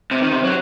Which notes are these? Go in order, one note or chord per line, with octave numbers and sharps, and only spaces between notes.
C3
D#3
C3
F#3